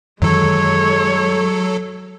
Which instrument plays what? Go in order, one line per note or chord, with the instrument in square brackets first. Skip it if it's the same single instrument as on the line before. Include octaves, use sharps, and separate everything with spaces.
[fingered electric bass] F#2 D#3 E3 [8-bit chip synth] F#3 A4 [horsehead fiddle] G#3 C#5